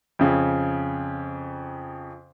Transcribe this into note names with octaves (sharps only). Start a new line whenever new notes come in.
F2 C#3